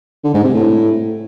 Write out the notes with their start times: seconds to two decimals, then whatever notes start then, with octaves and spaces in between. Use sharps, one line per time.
0.24 D3
0.34 G#2
0.44 C3
0.54 A2